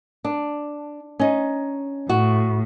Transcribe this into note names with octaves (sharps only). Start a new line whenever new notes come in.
D4
C#4 D#4
A2 F#4